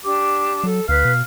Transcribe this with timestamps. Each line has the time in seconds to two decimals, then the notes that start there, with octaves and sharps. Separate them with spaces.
0.04 D4 G4 D6
0.64 F#3 A4
0.89 D2 B4 F5
1.05 B2